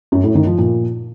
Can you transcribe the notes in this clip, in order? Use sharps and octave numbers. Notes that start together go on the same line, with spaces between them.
F#2
A2
D#3
F3
A#2